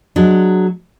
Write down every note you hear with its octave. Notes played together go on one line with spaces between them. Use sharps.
F#3 G#3 D4